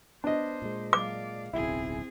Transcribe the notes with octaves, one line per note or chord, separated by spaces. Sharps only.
B3 D4 C5 D#5
A#2 G#3
D5 F5 D6
D1 B1 C4 E4 G#4